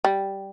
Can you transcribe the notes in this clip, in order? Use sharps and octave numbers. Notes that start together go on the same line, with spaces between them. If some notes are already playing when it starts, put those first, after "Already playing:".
G3